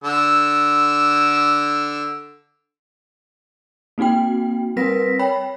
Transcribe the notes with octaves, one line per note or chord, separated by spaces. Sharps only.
D3 E6
A#3 C4 D#4 F#4 G5
G3 C4 A#4 B4 A#6 B6
C#5 G5 B5